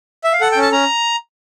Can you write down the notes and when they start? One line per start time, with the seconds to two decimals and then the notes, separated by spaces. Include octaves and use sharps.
0.24 E5
0.33 F5
0.41 A4 F#5
0.52 G5
0.56 C#4
0.62 A5
0.72 C#4 A#5